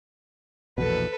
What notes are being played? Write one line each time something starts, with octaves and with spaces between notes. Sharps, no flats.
A#1 E2 B2 A4 B4